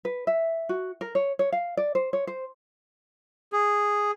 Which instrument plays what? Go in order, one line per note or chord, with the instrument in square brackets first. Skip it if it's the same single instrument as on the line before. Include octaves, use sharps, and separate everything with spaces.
[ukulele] B4
E5
F#4
A#4
C#5
C#5
F5
D5
C5
C#5
C5
[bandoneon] G#4